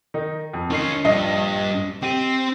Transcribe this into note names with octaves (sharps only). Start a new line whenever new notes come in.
D#3 D#4
F2
D#3 C#4 D#4 F4 C7
A#1 G2 D#5
C4 G4 D#7